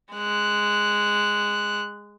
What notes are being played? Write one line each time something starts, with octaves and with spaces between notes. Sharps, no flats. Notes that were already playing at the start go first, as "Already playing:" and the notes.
G#3 F#6